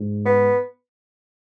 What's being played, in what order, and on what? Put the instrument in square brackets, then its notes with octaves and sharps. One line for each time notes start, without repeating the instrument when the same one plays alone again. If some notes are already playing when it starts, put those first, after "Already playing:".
Already playing: [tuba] G#2
[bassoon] B3